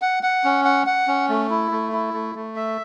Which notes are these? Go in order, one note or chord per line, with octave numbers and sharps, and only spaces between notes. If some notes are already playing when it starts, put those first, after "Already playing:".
F#5
F#5
C#4
F#5
F#5
C#4
A3
E4
A3
E4
A3
A3
E5